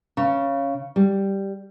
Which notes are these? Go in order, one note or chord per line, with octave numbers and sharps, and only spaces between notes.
C#3
G3